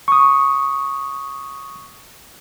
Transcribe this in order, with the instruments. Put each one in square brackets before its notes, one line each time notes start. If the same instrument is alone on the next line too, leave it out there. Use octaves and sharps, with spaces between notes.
[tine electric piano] C#6 D#6